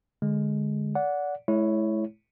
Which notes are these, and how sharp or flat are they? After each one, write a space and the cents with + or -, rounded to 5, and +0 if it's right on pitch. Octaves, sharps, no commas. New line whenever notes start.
D3 +0 G#3 +0
D5 -25 F#5 -10
G#3 +45 E4 +0 C#5 +0